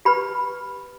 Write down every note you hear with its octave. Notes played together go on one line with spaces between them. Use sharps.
G4 B4 B5